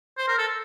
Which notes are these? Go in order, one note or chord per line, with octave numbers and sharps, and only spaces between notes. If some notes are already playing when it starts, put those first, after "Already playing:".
C5
A#4
A4